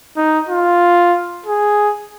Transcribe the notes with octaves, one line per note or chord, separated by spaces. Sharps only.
D#4
F4
G#4